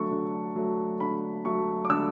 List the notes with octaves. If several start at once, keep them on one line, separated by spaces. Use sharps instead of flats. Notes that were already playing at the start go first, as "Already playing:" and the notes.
Already playing: D3 F#3 A3 C#6
D3
F#3 A3
D3 B5
F#3 A3 C#6
D6
D3 E6